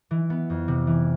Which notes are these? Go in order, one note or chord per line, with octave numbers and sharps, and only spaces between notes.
E3
B3
F2
C3
E3